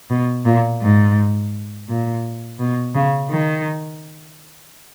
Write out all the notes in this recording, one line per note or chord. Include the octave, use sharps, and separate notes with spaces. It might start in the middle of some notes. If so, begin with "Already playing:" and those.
B2
A#2
G#2
A#2
B2
C#3
D#3